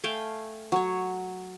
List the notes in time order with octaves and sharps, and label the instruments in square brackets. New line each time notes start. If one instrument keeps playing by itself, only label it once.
[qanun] A3 F5 G5 G#5
F#3 C#5